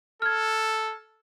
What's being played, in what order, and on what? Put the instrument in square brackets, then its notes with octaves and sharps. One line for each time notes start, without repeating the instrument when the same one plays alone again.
[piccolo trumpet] A4 [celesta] F6 G#6